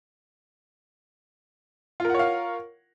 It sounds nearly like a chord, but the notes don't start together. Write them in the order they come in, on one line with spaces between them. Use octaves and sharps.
F4 A#4 F#5 C#5 F5